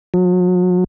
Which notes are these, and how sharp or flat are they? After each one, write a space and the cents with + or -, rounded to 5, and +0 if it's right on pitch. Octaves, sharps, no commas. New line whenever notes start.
F#3 -40